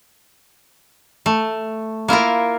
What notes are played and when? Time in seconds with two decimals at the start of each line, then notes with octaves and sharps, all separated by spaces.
1.26 A3
2.08 A#3 E4 F4 A#4